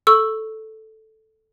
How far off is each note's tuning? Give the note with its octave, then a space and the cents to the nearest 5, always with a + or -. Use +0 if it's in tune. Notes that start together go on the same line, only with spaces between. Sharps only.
A4 +0 C#6 -5 E6 +0